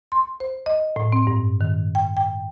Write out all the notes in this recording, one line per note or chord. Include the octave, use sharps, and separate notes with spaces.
C6
C5
D#5
A2
C4
G2
D#3
G5
G5